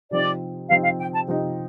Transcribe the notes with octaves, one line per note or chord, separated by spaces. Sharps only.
C3 F3 C4 D#4 D5
C3 F3 C4 D#4 F5
F5
G5
A5
C3 F3 C4 D#4